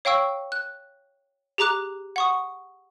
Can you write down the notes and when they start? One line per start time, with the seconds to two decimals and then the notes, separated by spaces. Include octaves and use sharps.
0.05 C#5 F5 G5 C#6 E6
0.52 F#6
1.58 G4 G#4 A#5 D6 F#6
2.16 F#5 C#6 D#6